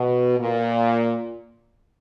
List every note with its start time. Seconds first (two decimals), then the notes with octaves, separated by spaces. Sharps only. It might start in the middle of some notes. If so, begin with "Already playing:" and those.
Already playing: B2
0.39 A#2